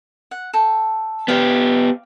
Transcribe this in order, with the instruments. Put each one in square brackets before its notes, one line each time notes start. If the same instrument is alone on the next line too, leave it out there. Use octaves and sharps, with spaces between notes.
[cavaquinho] F#5
A4 G5
[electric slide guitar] B3 G4 [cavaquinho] D5 F5 G5